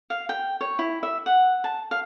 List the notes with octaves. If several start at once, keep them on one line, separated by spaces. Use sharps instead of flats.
F5
G5
C#5
E4
E5
F#5
A5
F5